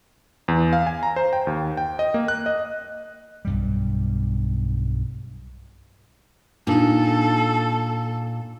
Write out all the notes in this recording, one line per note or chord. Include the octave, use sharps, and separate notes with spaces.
E2
F5
G#5
A#5
C5
G5
D#2
G5
D#5
A#3
F#6
D#5
B1 G2 G3
A#2 D4 D#4 A4